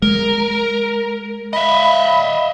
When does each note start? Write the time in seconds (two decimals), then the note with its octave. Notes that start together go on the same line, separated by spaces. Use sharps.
0.02 G#3 A#4
1.53 D#5 E5 B5